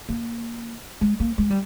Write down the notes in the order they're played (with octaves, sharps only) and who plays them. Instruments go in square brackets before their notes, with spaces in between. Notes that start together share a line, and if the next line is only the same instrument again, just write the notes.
[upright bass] A#3
G#3
A#3
G#3
G3